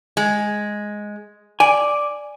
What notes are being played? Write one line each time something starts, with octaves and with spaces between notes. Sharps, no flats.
G#3
D5 G#5